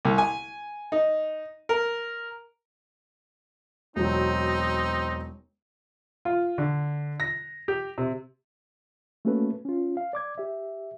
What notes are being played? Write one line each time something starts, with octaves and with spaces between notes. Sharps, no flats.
C2
G#5
D#4
A#4
E1 F#3 C4 D#4
F4
D3
A#6
G4
C3
A3 A#3 C#4 F#4 A4 B4
C#4 F4
F5
D5 D6 G#6
G4 E5